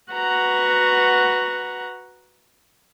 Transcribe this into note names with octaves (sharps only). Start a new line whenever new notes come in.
F#4 B4 F#5 A#5 C#6